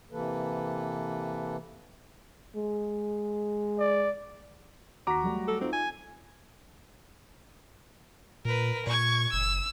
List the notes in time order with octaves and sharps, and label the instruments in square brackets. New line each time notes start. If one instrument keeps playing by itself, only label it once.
[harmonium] C3 E3 A#3 A4 B4
[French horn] G#3
[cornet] D5
[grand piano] D#2 B6 [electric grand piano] F#4 A#5 D6
[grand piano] F#3 G3 A3
[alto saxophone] A4
[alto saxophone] C4 [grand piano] D#4 F4
[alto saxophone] G#5
[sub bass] A#2 [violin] A#4 B4
[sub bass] A#2 [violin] C#6 G#6
[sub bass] F#1 [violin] E6